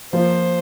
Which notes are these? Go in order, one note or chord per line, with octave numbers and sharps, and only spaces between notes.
F3 A#3 F4 C5